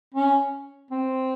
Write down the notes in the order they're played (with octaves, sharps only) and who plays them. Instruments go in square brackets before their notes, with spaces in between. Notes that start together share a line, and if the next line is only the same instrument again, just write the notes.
[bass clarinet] C#4
C4